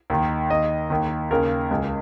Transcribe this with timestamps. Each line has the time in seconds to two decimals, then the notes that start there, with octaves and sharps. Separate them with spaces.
0.10 D#2 D#3
0.50 D#2 D#3 D#5
0.90 D#2 D#3
1.31 D#2 C#3 A#4
1.71 C#2 C#3